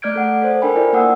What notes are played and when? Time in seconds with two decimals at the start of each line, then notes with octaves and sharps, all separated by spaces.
0.02 A3 D5 F6 G6 G#6 D7
0.16 A4 F#5
0.42 A4 C5
0.62 D4 A#4 C5 G5 G#5 B5
0.76 E4 F4 D5
0.93 A#3 D5 F#5 D#6 E6